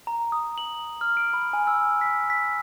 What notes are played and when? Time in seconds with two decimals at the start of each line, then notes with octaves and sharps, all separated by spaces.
0.07 A#5
0.32 D#6
0.58 F#7
1.01 F6
1.17 D7
1.33 B5
1.53 G#5
1.67 E6
2.01 B6
2.30 B6